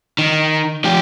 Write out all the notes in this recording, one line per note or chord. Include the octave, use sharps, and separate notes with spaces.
D#3
F3 G4